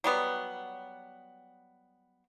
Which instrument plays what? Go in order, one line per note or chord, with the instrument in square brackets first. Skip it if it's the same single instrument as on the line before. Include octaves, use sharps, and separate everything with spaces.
[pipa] F#3 G3 B3